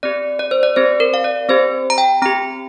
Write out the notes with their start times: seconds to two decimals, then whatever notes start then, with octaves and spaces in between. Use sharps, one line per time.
0.03 C4 G4 D5
0.39 D5
0.51 C5
0.63 D5
0.76 C4 G4 C5
1.00 A#4
1.14 F5
1.24 D5
1.49 C4 G4 C5
1.90 A#5
1.98 G5
2.22 C4 G4 A#5